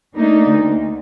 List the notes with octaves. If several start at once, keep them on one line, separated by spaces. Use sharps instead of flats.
A3 A#3 D4 D#4
D2